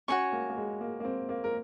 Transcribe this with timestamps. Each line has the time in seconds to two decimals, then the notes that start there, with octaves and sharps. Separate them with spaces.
0.08 C#4 F#4 C#5 G#5 C#6
0.32 A#3
0.50 A#3
0.57 G#3
0.81 A#3
1.00 A#3
1.05 C4
1.29 A#3
1.44 A#4